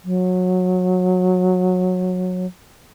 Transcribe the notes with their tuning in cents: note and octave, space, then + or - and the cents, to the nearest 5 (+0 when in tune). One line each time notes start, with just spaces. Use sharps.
F#3 -20